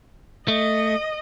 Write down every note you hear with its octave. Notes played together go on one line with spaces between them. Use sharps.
A3 D#5